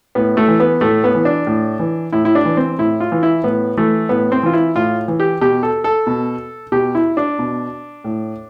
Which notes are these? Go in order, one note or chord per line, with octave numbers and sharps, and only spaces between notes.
A2 B3
A3
E3
B3
A2 A3
B3
E3
D4
A2
E3
A2 E4
E4
D4
E3
C4
A2 E4
F4
E3
E4
A2 B3
E3 A3
A2 B3
C4
E3 F4
E4
A2 F4
E3
G4
B2 G4
A4
A4
B2
B2 G4
E4
D4
B2
A2